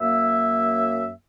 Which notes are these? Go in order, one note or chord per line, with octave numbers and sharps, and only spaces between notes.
F#2 A#3 E5